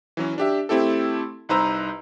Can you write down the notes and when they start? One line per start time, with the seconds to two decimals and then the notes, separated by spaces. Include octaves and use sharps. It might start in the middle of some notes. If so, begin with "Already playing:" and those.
0.17 E3 F#3 C#4
0.38 D4 G4 E5
0.69 A3 C4 E4 G4 A4
1.49 C2 D#4 B4 C5 A#5 E6